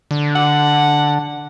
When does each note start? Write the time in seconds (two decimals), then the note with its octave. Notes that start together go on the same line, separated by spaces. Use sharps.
0.11 D3
0.35 F#5